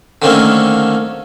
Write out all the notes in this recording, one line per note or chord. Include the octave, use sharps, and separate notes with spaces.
D3 D#3 A3 A#3 C4 C#4